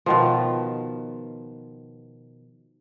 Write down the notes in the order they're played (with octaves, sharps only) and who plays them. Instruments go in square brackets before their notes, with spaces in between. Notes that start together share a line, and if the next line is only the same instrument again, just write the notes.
[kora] B2 D#3 F3